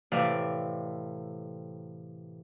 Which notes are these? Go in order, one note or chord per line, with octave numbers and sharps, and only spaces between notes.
A2 C3 E3 D5 E5 F5